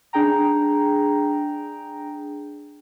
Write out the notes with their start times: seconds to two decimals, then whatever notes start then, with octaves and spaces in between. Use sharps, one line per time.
0.13 D4 G#4 G5 A#5